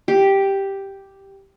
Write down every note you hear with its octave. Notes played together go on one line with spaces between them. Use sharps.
G4